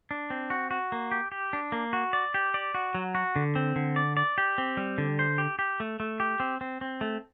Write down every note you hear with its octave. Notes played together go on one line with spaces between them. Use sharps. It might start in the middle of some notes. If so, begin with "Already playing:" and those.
D4
C4
F#4
F#4
A#3
G4
G4
D4
A#3
F#4
D5
G4
D5
F#4
F#3
F#4
D3
C4
D3
D5
D5
G4
C4
G3
D3
C5
G4
G4
A3
A3
G4
C4
C4
C4
A3